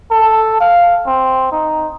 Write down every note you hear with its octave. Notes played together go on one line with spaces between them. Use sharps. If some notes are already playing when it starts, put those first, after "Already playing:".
A4
F5
C4
D#4